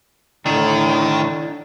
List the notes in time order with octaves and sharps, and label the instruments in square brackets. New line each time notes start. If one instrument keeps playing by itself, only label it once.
[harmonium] A2 D3 [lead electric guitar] D#3 [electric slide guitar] D4 E4